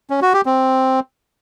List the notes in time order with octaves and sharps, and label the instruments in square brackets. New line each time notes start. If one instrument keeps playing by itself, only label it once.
[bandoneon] C#4
F#4
G4
C4